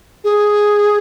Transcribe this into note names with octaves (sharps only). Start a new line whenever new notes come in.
G#4